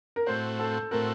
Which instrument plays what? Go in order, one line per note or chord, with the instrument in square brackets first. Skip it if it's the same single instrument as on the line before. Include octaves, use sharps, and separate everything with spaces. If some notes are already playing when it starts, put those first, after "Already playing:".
[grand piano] A#4
[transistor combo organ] A2 A3 C4 F#4 [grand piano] C5
[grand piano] A4
[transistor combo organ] A2 A3 C4 F#4 [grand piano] A#4